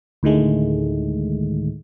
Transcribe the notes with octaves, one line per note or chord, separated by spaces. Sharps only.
D2 A2 D#3 G#3 A3